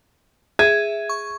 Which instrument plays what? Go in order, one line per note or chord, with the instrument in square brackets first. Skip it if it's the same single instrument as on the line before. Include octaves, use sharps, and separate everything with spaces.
[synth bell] G#4 E5 [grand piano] G#6
[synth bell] C#6